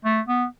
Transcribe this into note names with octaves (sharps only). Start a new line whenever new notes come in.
A3
B3